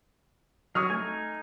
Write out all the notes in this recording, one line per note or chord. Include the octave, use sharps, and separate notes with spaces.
F#3 C#6 D#6 F6
A3 D#4 G#5